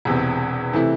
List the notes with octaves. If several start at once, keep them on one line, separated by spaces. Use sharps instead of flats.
E1 E2 C3
C3 E3 A3 E4